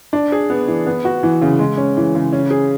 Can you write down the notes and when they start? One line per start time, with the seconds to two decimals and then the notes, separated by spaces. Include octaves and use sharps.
0.13 D4
0.32 G#4
0.50 B3
0.68 E3
0.86 B3
1.05 F#4
1.23 E3
1.42 C#3
1.59 G#3
1.77 C#4
1.97 E3
2.15 C#3
2.32 C#4
2.51 G#4